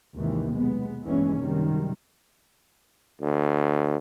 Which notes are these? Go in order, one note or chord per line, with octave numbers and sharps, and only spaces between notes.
G#1 D#2 C3 D#3 E3
B1 G#3 B3
A#1 E2 G2 E3 G#3 C#4
F#2 C3 D#3 G3
D2